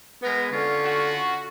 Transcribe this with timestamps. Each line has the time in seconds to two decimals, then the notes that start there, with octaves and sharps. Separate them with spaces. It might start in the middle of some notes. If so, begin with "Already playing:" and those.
0.22 G#3 B3 A#4 B4
0.52 D3 C#4 F4 C#6
0.85 F#4